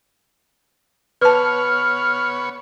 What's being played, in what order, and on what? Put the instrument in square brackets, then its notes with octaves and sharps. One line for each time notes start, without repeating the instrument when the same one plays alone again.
[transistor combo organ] B3 C#5 [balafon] B4 A5 [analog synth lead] F6